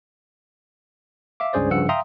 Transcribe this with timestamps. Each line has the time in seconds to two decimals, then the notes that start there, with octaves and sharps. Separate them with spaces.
1.40 E5 F5 D6
1.53 C#2 G2 C#4 G#4 C5 D5
1.70 G2 C#3 F3 F#5 E6 C#7
1.89 E5 F5 G5 A#5 C6 D#6